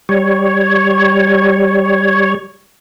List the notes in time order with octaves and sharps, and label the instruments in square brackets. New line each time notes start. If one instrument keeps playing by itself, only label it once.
[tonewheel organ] G3 C#5